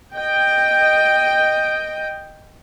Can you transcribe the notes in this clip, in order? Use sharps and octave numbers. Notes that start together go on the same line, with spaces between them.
D#5 G5